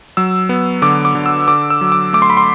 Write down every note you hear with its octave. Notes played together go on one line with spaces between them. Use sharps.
F#3 E6
B3
D3 D6
D6
D3
E6
D3 D6
E6
F#3
D6
A3 D6
C6
B5
C6